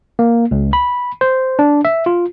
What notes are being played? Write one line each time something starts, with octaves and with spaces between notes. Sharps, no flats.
A#3
C#2
B5
C5
D4
E5
F4